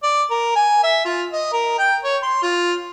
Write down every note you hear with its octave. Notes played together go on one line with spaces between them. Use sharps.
D5
A#4
G#5
E5
F4
D#5
A#4
G5
C#5
C6
F4